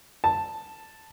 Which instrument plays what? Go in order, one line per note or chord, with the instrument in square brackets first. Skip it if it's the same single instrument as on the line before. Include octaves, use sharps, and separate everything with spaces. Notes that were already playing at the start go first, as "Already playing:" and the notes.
[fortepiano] A5